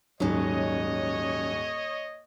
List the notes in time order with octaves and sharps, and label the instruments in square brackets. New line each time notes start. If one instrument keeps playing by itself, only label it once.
[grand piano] D#1 G#2 [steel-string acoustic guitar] F#3 C#4 [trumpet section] C#5 D#5